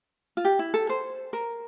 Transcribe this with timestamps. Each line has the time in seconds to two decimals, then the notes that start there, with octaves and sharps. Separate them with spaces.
0.37 F4
0.45 G4
0.59 E4
0.74 A4
0.89 C5
1.33 A#4